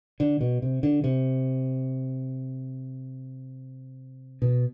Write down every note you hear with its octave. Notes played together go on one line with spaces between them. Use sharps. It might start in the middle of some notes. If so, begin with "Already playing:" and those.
D3
B2
C3
D3
C3
B2